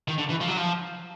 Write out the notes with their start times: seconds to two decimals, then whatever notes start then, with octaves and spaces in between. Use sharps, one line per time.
0.08 D#3
0.18 D3
0.30 E3
0.41 F3
0.48 F#3
0.57 F3